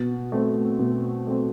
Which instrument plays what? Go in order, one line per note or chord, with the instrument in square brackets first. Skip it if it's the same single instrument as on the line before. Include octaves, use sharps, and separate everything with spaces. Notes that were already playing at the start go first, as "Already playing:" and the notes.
Already playing: [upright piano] B2
A3 C4
B2
A3 C4